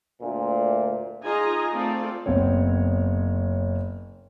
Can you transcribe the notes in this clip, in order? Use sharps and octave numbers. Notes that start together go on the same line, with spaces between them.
D2 A#2
D#4 F4 G#4 D#5 G#5 A#5
A3 C4 F4 A4 D5
F#1 B3 C4 C#5